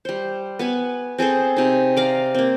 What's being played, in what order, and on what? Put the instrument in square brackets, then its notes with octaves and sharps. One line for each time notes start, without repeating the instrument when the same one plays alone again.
[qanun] G3 C5
B3 B4 G#5
C4 G#4 A4 C5
C3 D#4
D5 F5 A#5
A#3 C4